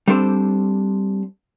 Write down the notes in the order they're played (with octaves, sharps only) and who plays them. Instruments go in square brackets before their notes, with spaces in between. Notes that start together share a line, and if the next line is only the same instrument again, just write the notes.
[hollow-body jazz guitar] G3 C4 D4 A4 C5